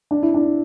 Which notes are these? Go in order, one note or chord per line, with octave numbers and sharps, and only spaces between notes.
D4
E4
D4